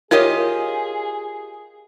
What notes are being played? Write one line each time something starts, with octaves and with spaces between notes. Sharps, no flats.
F4 G4 G#4 A#4 C#5 D#5